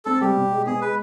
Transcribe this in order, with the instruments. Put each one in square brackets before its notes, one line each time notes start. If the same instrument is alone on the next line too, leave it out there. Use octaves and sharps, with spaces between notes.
[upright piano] C4 [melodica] A4
[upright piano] G3 [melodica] G4
[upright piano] B2
G#3
[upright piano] B3 [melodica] G#4
[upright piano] G#3 [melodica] B4